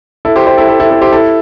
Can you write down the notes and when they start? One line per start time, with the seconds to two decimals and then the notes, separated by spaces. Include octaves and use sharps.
0.25 E4 A4
0.36 G4 C5
0.47 G4 C5
0.57 E4 A4
0.68 E4 A4
0.80 E4 A4
0.90 E4 A4
1.01 G4 C5
1.12 E4 A4